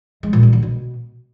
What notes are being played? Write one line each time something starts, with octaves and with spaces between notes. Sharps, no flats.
G#3
A#2
G3
D3
B2